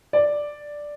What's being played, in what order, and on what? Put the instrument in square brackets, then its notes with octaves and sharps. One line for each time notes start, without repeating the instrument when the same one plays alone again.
[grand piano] D5